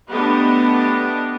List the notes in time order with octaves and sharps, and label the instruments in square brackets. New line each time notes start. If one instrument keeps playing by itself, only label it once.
[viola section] A3 B3 D4 G4 D#5